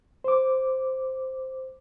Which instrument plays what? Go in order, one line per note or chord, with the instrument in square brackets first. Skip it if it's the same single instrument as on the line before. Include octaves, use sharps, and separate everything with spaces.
[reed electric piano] C5 D6